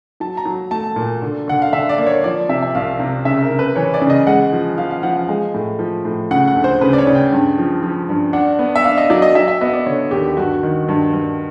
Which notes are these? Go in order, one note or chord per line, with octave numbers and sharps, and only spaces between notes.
F#3 A5
A#5
F#3
A3 A5
A#2
D3
D3 F#5
F5
D3 E5
D5
A#3
C#5
F3 D5
C3 E5
E5
C2 F5
C3
C#3 E5
A#4
C#3
B4
E3 C#5
D5
C#3
D#5
G#3 F#5
F3
F3 F5
F5
F3 F#5
F5
G#3
A2
F3
A2
C#3 F#5
F#5
D2
C5
C#3 B4
D5
C#5
C#3
G5
G2
F3
F3
G2
D4 F#5
B3
E5
D4 F5
D#5
F#3 D5
D#5
F#3 E5
E5
B3 D#5
D5
D3 C#5
D#2 G4
G2 F#4
D#3
G2
G2